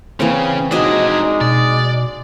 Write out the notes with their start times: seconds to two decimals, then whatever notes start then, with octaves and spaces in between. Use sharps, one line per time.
0.20 C#3 E3 A#3 C4
0.71 G#3 D4 D#4 F#4 G#4 D#5 E5
1.41 B2 D5